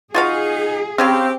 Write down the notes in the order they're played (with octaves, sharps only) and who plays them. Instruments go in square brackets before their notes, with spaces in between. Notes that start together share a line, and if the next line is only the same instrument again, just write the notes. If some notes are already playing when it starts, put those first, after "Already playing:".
[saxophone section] D#4 [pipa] F4 F#4 F5 [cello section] G#4
[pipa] C#3 C#4 F5 [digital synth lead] C4 [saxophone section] G4